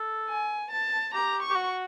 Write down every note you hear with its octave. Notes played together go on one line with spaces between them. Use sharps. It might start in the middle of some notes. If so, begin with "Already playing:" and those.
Already playing: A4
G#5
A5
G4 A#5
C#6
G4
F#4